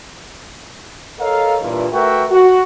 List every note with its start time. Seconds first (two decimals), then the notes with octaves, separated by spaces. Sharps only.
1.19 A4 A#4 C#5 D#5 F5
1.61 G2 A#2 E3
1.91 A3 F#4 A#4 B4 E5 G5
2.30 F#4